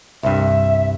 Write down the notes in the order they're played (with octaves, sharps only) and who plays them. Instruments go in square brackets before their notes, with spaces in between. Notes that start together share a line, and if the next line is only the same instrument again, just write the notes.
[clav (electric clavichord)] C2 G2 [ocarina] E5